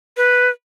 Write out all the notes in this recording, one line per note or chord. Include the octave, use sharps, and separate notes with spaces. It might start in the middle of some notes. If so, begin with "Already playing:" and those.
B4